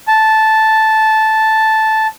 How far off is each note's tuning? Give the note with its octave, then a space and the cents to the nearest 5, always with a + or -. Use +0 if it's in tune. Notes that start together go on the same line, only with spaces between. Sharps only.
A5 -5